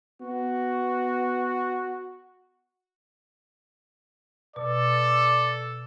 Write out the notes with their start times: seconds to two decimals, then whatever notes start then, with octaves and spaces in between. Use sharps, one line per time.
0.21 B3 F#4
4.56 B2 A4 D5